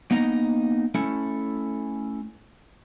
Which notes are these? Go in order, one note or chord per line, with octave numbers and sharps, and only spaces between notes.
A#3 B3 D#4 D#5 A#5
A3 C#4 E4 A4